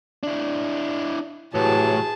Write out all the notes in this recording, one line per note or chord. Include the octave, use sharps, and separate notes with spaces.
D4 E4
A2 C3 E3 F#3 G#4 A5